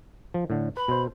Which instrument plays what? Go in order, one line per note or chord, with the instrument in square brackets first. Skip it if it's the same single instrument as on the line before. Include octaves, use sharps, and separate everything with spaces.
[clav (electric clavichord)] F3
A2 D3
[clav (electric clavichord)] B4 [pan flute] B5
[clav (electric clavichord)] B2 C5